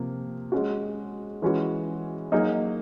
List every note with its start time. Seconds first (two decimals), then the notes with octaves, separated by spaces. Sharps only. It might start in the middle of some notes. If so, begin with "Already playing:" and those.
Already playing: C3 F3 A#3
0.52 G#3 C#4 F#4
1.42 E3 G#3 C#4 F#4
2.32 F#3 A#3 D#4 G#4